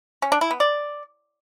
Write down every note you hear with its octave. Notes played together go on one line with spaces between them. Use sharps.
C#4
D4
E4
B3
D5